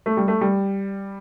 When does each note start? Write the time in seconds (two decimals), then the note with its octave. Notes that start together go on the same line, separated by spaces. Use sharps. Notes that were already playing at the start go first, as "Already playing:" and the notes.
0.06 A3
0.17 G3
0.28 A3
0.41 G3